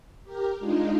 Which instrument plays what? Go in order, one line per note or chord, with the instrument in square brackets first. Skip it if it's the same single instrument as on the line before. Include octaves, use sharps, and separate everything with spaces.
[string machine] G4 A#4
G#3 D4 D#4 F4